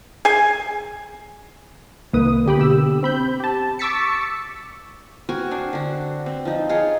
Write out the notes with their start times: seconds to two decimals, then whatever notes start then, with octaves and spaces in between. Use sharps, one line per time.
0.25 G#4 G#5
2.13 C2 D#3 A#3 B4 D#6
2.45 D3 A#3 G4 G5 B5
2.58 B2 D3 G4 E6
3.03 C4 B5 G6
3.40 G4 A5
3.79 C#6 D6 E6 A6 B6 C#7
5.29 C4 F#4 A#4 G#5
5.51 D4 A#4 C5
5.73 D3 F#4
6.26 C4
6.45 F3 D#4
6.69 D#4 F4 G#4 C#5